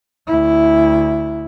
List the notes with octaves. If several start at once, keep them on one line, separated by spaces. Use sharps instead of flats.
D2 E4